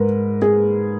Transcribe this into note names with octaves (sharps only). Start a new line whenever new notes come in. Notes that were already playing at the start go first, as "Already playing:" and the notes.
Already playing: G#2 A#4 B4
G#4